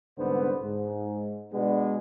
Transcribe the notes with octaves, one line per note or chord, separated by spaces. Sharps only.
C2 G#2 D3 B3 C5
G#2
B2 G#3 B3 D4